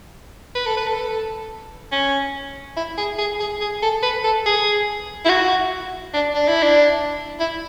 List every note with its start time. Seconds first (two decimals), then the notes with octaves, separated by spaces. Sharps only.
0.55 B4
0.66 A4
0.77 B4
0.87 A4
1.92 C#4
2.76 E4
2.98 G#4
3.18 G#4
3.40 G#4
3.61 G#4
3.82 A4
4.03 B4
4.24 A4
4.46 G#4
5.25 E4
5.29 F#4
6.14 D4
6.35 D4
6.48 E4
6.63 D4
7.40 E4